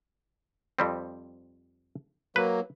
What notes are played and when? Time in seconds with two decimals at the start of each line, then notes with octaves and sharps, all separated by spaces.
0.79 F2 G3 C4
2.36 F#3 A#3 B4